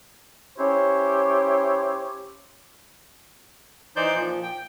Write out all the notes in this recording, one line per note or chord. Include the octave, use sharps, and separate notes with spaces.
C#4 E4 G4 C5 C#5
E3 D#4 C5 D5 G6
A#2 F3
G5